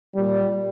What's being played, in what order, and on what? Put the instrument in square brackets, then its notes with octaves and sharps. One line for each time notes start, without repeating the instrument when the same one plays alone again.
[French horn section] A#2 G3